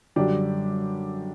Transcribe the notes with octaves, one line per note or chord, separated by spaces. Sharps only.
F#2 D3 G3 D4 G4